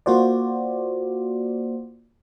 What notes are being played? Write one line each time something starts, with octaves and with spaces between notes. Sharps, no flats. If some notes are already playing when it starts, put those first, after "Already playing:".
A#3 F4 F#4 C5 D5